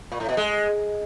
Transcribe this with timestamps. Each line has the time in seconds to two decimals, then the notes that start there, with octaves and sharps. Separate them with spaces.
0.12 A#2
0.20 A2
0.29 B2
0.37 G#3